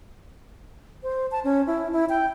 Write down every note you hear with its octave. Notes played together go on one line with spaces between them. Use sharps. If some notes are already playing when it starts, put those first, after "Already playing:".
C5
A5
C#4
E4
E4
G5